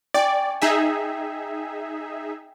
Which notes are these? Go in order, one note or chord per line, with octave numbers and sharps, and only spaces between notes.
D5 G5 G#5 C#6
D#4 G#4 E5